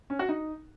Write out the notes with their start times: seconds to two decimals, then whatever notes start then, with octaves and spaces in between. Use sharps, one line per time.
0.10 C#4
0.19 F#4
0.29 D#4